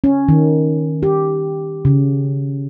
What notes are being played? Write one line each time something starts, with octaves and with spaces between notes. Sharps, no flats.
C#4
D#3
G4
C#3